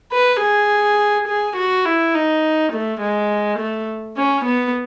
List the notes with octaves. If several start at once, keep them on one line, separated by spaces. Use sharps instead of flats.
B4
G#4
G#4
F#4
E4
D#4
A3
G#3
A3
C#4
B3